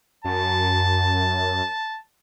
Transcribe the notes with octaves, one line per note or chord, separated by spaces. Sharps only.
F#2 A5